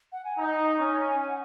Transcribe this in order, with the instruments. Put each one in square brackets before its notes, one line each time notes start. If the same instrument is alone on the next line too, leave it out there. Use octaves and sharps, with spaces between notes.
[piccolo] F#5
G#5
[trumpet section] D#4 [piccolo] A#5
[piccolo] A#5
[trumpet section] C#4 [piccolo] C#6
[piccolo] G#5
G#5
F#5